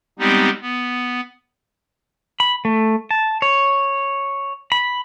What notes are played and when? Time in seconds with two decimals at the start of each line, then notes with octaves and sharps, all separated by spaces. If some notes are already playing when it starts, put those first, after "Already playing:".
0.19 G3 G#3 B3 C4 D#4 G4
0.62 B3
2.40 B5
2.65 A3
3.11 A5
3.42 C#5
4.72 B5